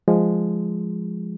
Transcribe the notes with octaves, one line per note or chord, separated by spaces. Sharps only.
F3 G#3